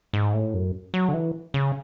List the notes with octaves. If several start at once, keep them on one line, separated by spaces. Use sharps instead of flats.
G#2
A2
F#2
F#3
D3
E3
C#3